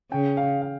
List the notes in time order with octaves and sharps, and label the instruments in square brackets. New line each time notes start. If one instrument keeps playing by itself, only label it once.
[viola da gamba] C#3 [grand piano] G5
[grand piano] F5
F5